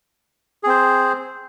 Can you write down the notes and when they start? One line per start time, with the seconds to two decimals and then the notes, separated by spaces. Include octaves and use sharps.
0.63 G#4
0.66 C4
0.69 C5